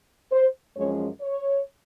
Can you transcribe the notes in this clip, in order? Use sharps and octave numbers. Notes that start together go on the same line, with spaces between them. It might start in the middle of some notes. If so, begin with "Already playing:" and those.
C5
F#2 F3 G#3 C#4 C#5
C#5